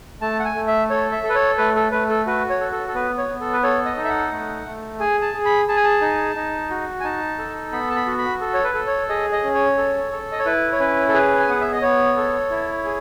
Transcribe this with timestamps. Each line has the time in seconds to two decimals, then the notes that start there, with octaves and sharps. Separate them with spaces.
0.21 A3 A5
0.39 F#5
0.45 G#5
0.55 A3
0.68 E5
0.90 A4 C#5
1.12 E5
1.23 A4
1.30 B4
1.35 C#5
1.58 A3 B4
1.76 A4
1.92 A3 B4
2.09 A4
2.26 F#4 B4
2.50 C#5
2.60 A4
2.72 A4
2.88 A4
2.94 B3 B4
3.18 C#5
3.28 B3
3.41 A4
3.53 B4
3.63 A4 C#5
3.85 D#5
3.97 D#4
4.04 E5
4.09 F#5
4.31 A3
4.66 A3
5.00 G#4 G#5
5.22 A5
5.34 G#4
5.45 B5
5.68 G#4 A5
5.76 G#5
5.84 A5
6.01 D#4
6.36 D#4
6.70 F#4
7.00 G#5
7.04 D#4 A5
7.39 A4
7.72 B3 B5
7.90 A5
7.96 B5
8.07 F#4
8.18 B5
8.41 A4
8.54 C#5
8.64 B4
8.74 A4
8.87 C#5
9.09 G#4 D#5
9.32 D#5
9.44 C#4
9.54 C#5
9.77 A4
10.12 A4
10.32 D#5
10.39 C#5
10.46 E4 B4
10.72 C#5
10.79 C#4 B4
11.09 A4
11.14 G#4 B4
11.40 G#5
11.48 B3 F#5
11.61 E5
11.72 D#5
11.82 B3 C#5
12.17 A4
12.50 E4
12.85 G#4